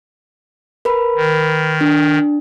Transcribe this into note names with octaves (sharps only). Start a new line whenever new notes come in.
A#4 B4 B5
D#3
D4